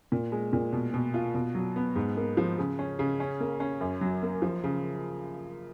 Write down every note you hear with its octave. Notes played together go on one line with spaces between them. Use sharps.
A#2
G#3
A#2
B2
B2
F4
B2
F#3
B3
G#2
A#3
F3
C#3
C#4
C#3
C#4
A#3
C#4
F#2
F#3
A#3
F3
C#3